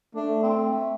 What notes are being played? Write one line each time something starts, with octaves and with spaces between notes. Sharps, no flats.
A3 D4
C4
A3